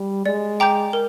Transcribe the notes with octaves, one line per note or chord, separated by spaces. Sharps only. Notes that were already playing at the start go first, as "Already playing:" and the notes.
Already playing: G3
G#3 D5
G5 A#5 D6 G6
A#4